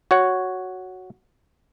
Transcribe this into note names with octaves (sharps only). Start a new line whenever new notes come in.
F#4 C#5 F#5